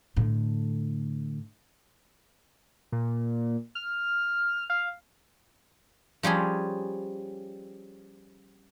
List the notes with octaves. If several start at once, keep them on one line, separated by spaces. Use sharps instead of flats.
A2 D3
A#2
F6
F5
F3 G3 C#4 G#4